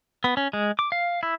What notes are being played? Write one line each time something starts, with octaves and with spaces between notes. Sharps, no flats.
B3
C#4
G#3
D6
F5
E4